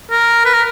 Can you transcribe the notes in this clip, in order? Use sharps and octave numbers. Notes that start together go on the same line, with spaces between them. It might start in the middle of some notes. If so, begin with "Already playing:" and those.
A#4
B4
A#4